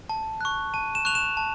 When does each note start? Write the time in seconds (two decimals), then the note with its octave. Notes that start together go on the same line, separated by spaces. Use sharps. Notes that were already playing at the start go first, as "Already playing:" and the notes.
0.09 A5
0.41 C#6 F#6
0.74 A5 D#7
0.95 E7
1.05 C#6 F#6 F7
1.15 E7
1.37 A5